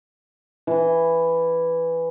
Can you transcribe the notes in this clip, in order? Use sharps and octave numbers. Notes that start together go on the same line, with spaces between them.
E3